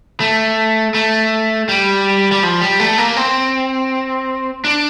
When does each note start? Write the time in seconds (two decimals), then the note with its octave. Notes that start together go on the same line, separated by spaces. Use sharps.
0.20 A3
0.94 A3
1.69 G3
2.32 G3
2.43 F3
2.61 G3
2.80 A3
2.98 A#3
3.17 C4
4.65 D4